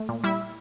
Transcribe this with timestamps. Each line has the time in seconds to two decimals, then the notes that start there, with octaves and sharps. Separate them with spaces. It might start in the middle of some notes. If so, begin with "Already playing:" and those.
Already playing: A3
0.09 A#2
0.24 G3 E4 E5